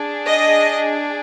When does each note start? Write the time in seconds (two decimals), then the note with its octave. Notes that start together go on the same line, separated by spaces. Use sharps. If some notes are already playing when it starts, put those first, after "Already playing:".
Already playing: D4 G#4
0.27 D#5